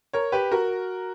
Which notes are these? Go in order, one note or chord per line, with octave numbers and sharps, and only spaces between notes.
A#4 C#5
G4 B4
F#4 A#4